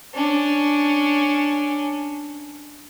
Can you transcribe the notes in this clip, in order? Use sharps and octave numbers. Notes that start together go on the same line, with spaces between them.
C#4 D4